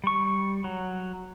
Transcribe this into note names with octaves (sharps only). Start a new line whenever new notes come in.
G3 C#6
F#3